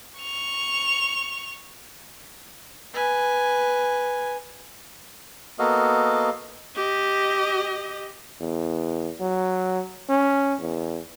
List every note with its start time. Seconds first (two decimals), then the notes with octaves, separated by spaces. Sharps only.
0.20 C#6 F7
2.94 B4 G#5
5.59 A#3 B3 F#4 A4 D#5 F5
6.76 G4 D#5
8.40 E2
9.20 F#3
10.09 C#4
10.60 E2